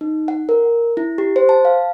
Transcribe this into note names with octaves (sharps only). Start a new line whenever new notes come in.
D#4
F#5
A#4
E4
G4
C5
A5
F5